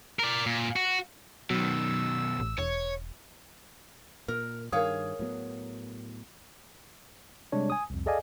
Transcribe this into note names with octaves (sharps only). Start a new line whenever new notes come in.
A#4 D5
A#2
F#4
B2 D#3 F#3 E6
A1
E1 C#5
A#2 A#4
G2 D#3 G#4 A#4 C#5 F5 D#6
A2 F#3 B3
C3 G3 G#3 D4 C#5
G#5 D#6
C2 F2
G#4 A4 D5 D#5 F5 G#5